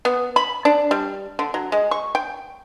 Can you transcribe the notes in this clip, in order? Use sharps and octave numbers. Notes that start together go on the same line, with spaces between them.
B3
B5
D4
G3
D3
F#3
G#3
C#6
G5